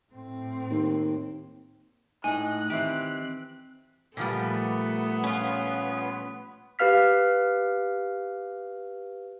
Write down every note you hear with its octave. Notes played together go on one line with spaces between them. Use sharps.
A2 C4
D#2
A2 D#4 D#5 G#5 F#6
D#3 E3 C4 G4
A#2 F3 G3 A3 B3
C#4 F4
G4 B4 F5 F6 B6